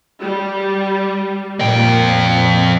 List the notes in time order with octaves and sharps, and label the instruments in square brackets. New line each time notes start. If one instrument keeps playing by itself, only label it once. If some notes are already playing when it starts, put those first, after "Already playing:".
[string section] G3
[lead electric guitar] F2 G5 [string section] A#2